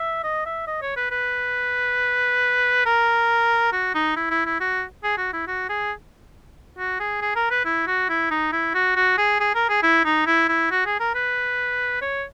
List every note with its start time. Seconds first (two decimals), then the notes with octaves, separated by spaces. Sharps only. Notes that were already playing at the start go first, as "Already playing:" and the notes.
Already playing: E5
0.24 D#5
0.46 E5
0.67 D#5
0.82 C#5
0.96 B4
1.11 B4
2.86 A#4
3.72 F#4
3.94 D#4
4.16 E4
4.31 E4
4.45 E4
4.60 F#4
5.04 G#4
5.17 F#4
5.33 E4
5.47 F#4
5.69 G#4
6.78 F#4
7.00 G#4
7.21 G#4
7.35 A#4
7.51 B4
7.65 E4
7.87 F#4
8.09 E4
8.31 D#4
8.52 E4
8.74 F#4
8.96 F#4
9.18 G#4
9.40 G#4
9.55 A#4
9.69 G#4
9.83 E4
10.05 D#4
10.26 E4
10.48 E4
10.71 F#4
10.86 G#4
11.00 A#4
11.15 B4
12.01 C#5